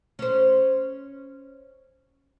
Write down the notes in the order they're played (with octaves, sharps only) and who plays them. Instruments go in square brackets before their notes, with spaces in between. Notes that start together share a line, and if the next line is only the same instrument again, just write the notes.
[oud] C#4 C5